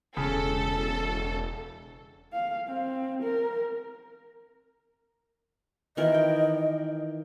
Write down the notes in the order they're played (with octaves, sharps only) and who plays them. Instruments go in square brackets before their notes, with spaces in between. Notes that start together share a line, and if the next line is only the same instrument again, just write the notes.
[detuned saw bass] E1 [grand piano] C#3 [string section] A4
[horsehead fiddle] F5
C4
A#4
[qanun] D#3 E3 A#4 [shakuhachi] D#5
[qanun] G5